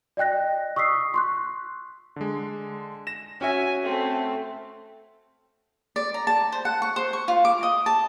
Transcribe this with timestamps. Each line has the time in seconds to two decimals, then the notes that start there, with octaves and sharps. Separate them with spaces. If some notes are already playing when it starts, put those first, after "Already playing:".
0.17 D5 D#5 G5 F#6 A#6
0.76 C#6 D#6 E6 B6 C7
1.14 C6 C#6 F#6
2.16 D3 G#3
3.07 A#6 E7
3.41 C#4 F#4 E5 G#5
3.84 A3 C4
5.96 D5
6.14 A#5
6.27 A5
6.52 C5
6.65 F#5
6.82 C#6
6.96 C5
7.13 C#6
7.28 F4
7.45 D6
7.63 D#5
7.86 A5